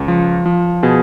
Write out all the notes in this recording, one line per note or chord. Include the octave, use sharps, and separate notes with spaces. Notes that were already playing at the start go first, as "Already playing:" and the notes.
Already playing: C#2
F3
F3
B2 G#4